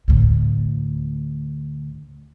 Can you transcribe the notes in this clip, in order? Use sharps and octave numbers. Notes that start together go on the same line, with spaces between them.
D2 A2